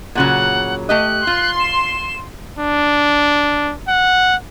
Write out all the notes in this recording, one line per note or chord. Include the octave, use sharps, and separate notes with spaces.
A#2 C#3 F#3 F#5
A3 G4 D#5 F#6
F4 C6
E7
D4
F#5